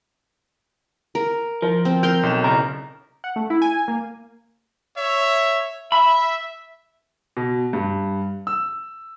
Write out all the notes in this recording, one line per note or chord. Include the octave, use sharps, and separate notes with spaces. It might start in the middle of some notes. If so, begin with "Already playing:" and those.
A#4
F3 A#4
C4
A#4 C6 G6
B1 E7
C#3 A#4 A#5
F#5
A3
E4
G#5
A#3
C#5 E5
E5 B5
B2
G2
E6